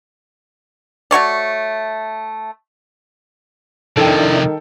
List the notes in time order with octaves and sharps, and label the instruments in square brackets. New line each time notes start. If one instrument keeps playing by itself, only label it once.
[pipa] A3 F#4 C#5 D5
[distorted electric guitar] C3 F3 [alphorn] D#3 [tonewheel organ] D4 E4 [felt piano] A4 G5